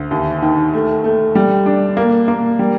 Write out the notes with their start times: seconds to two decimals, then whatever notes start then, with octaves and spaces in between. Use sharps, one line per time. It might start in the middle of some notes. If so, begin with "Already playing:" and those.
Already playing: D2
0.11 D#2
0.42 D#3
0.73 A3
1.04 A3
1.35 G3
1.66 D4
1.97 A#3
2.28 A#3
2.59 G3